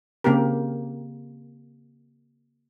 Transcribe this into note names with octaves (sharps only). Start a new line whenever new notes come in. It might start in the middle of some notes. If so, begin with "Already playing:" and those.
C#3 A#3 C4 G4 A#4